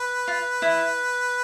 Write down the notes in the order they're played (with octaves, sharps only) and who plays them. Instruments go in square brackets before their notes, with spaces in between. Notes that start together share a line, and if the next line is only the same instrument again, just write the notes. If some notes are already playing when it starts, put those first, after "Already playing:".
Already playing: [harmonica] B4
[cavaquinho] F4
E4